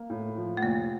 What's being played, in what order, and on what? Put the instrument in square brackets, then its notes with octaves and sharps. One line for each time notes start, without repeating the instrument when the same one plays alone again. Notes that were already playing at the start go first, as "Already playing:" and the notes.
Already playing: [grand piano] A#3
A2
F3
[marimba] A3
[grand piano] F1 [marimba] A#3